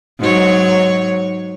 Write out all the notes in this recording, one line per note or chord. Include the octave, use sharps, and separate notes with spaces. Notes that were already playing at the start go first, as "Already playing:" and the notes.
G#2 F#3 C#5